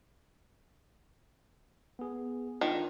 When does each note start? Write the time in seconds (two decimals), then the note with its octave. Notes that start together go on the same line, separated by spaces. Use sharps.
1.99 B3 G#4
2.61 D#3 D4 F4